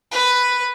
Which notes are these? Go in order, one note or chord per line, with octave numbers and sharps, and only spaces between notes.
B4